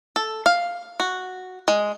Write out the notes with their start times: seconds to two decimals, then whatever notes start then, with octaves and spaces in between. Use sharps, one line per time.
0.16 A4
0.46 F5
1.00 F#4
1.68 G#3